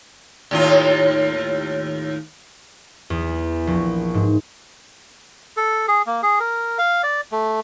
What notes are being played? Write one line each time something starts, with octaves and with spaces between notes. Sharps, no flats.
D#2 A2 F4
E2
A#1
G#2
A4
G#4
A#3
G#4
A#4
F5
D5
A3